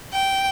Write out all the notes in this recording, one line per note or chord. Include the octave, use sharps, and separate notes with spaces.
G5